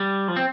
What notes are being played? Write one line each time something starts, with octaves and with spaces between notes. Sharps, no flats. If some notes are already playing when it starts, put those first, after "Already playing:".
Already playing: G3
F3
C4